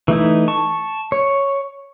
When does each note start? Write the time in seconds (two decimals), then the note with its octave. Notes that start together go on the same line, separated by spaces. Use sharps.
0.08 E3 A3 D#4 E4
0.48 A5 C#6
1.12 C#5